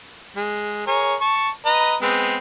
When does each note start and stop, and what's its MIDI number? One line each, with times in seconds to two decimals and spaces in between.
0.36 0.85 56
0.87 1.15 68
0.87 1.15 70
0.87 1.15 73
1.21 1.49 81
1.21 1.49 85
1.65 1.96 71
1.65 1.96 75
1.65 1.96 82
2.02 2.37 56
2.02 2.37 59
2.02 2.37 60